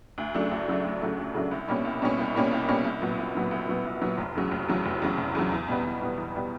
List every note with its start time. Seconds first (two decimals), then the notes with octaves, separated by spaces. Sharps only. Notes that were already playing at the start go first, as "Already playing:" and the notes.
0.18 D2
0.34 C#3 F#3 A3 D4
0.51 D2
0.68 C#3 F#3 A3 D4
0.85 D2
1.01 C#3 F#3 A3 D4
1.18 D2
1.34 C#3 F#3 A3 D4
1.51 C2
1.68 B2 G3 A#3 C#4
1.85 C2
2.02 B2 G3 A#3 C#4
2.18 C2
2.35 B2 G3 A#3 C#4
2.51 C2
2.69 B2 G3 A#3 C#4
2.85 C2
3.01 A#2 F#3 B3
3.18 C2
3.35 A#2 F#3 B3
3.51 C2
3.68 A#2 F#3 B3
3.85 C2
4.02 A#2 F#3 B3
4.18 F1
4.35 E2 C#3 F#3
4.51 F1
4.68 E2 C#3 F#3
4.85 F1
5.02 E2 C#3 F#3
5.18 F1
5.35 E2 C#3 F#3
5.52 E2
5.68 B2 G3 B3
5.84 E2
6.01 B2 G3 B3
6.18 E2
6.35 B2 G3 B3